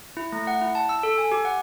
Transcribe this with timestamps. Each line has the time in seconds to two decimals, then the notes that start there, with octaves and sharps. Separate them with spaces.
0.17 E4
0.32 A3
0.47 F#5
0.61 E4
0.75 A5
0.89 E6
1.03 A4
1.18 G#5
1.32 G4
1.45 F#5